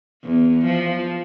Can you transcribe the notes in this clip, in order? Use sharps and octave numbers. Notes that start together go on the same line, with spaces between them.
E2
F3